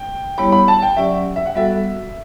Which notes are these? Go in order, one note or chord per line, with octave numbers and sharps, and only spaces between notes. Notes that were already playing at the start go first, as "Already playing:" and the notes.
Already playing: G5
G3 B3 E4 G4 C#5 B5
B5
A5
G5
F#3 C#4 G4 D5 E5 F#5
E5
F#5
G3 B3 F#4 A4 E5